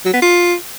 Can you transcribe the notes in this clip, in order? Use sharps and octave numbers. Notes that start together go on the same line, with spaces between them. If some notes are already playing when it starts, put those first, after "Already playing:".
F#3
B3
F4